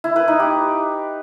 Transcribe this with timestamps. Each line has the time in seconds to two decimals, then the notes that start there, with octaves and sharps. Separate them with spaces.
0.04 E4
0.16 B4
0.28 D#4
0.40 G4